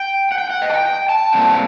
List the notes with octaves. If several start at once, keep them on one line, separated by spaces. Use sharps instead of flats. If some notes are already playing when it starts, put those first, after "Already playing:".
Already playing: G5
F#5
G5
F#5
D#5
A5
G5
G5
A5
C3 G3 A#3 G5
A5